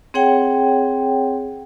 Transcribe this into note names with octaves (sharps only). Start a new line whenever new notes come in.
C4 G#4 C#5 F#5 G5